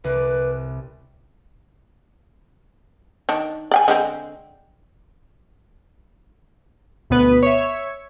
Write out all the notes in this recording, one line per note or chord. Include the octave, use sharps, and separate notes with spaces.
C2 B4 D5
D#3 D4
D5 G5 G#5
D3 G#3 C4
D2 B2 B3 B4
C#5 E5